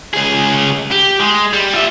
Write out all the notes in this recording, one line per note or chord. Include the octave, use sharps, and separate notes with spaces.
C#2 G#4
G4
G#3
G3
F4 E5